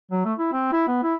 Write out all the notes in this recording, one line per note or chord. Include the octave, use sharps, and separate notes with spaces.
F#3
A3
E4
C4
E4
B3
E4